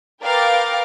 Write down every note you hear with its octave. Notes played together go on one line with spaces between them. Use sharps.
A#4 B4 F5 G5 D6 A6